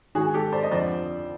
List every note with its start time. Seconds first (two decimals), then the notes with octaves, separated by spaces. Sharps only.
0.15 G#2 D#3 F#4 G#4
0.34 G4 A4
0.52 C5 D5
0.63 D#5
0.71 F2 D3 F3 C5 D5